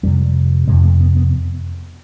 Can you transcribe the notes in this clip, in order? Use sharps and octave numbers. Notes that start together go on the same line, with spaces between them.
F2 C3 G3
F2 C3 G#3
A3
B3
B3